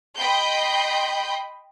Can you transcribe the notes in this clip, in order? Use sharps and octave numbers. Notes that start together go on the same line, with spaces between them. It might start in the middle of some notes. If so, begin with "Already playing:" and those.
D#5 G5 B5 C6 G6